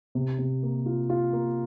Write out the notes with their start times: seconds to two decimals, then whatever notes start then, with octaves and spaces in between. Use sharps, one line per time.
0.15 C3
0.39 C3
0.63 A#3
0.86 F4
1.10 F4
1.33 A#3